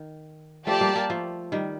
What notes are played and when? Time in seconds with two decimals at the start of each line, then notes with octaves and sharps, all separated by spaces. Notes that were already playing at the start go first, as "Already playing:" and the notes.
Already playing: D#3
0.67 F3 A3 G4 D5 A5
0.81 G3 A#3
0.95 G3 A#3
1.10 F3 A3
1.52 D#3 G3